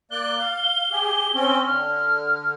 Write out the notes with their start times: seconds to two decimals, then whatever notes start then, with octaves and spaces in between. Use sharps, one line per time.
0.11 A#3 D5 F#6 G7
0.39 F5
0.92 G4 G#4
1.34 C4 C#4
1.65 D3 F6